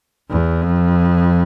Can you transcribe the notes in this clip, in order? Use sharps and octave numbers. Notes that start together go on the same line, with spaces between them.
E2
F2